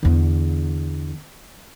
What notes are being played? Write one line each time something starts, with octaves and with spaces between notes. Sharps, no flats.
E2 D3